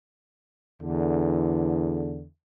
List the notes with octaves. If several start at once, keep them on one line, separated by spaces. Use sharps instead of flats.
E2 D3